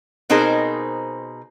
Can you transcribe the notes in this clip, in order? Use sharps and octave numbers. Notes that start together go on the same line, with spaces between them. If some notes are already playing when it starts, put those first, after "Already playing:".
B2 C4 D#4 G#4 A#4 C5